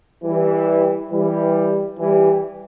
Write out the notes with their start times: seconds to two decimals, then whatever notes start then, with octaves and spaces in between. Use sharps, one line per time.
0.24 E3 G3
1.11 E3 G3
1.99 E3 G3